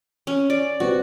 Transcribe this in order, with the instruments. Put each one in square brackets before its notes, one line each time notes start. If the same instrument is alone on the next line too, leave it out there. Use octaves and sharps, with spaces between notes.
[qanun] C#4
D5
[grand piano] G3 B3 C4 [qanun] F#4